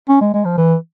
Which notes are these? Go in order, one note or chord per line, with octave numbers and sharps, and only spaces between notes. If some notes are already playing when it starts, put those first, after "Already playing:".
C#4
G#3
G#3
F3
E3